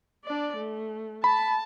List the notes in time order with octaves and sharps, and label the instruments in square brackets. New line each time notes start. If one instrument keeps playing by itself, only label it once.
[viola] D4 D5
A3
[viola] A5 [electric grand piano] B5